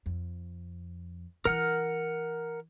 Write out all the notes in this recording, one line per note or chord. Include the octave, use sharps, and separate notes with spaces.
F2
E3 E4 A#4 F#5 F6